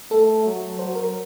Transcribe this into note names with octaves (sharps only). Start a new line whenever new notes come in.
A3 A4
F#3
F#3 C5
A#4